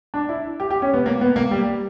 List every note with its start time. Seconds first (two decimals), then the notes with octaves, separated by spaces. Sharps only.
0.14 D4
0.29 E4
0.60 G4
0.71 G4
0.82 C#4
0.93 B3
1.06 A#3
1.21 B3
1.36 A#3
1.51 G3